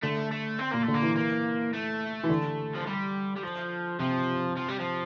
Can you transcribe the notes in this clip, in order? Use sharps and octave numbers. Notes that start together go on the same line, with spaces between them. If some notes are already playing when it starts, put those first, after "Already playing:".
D3 A3
A3
C4
A#2 A#3
A3
D3
A#3
E3
A#3
A3
E3
D3
F3
G3
G3
F3
C3 F3
F3
G3
F3